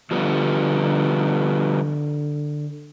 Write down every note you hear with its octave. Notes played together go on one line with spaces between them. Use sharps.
D3 F3 G3 B3